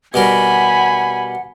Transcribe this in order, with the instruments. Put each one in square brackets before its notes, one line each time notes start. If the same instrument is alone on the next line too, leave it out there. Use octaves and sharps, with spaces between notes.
[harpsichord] B2 G3 A#4 [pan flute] F#5 [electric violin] G#5 B5